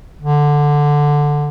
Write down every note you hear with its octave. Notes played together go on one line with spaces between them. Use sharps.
D3